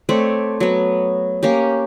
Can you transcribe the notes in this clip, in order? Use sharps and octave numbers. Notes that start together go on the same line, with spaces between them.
A3 C4 C#5 D5
F#3 B3
A#3 C#4 G4